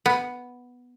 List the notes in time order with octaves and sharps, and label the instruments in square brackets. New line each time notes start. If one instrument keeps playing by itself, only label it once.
[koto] B3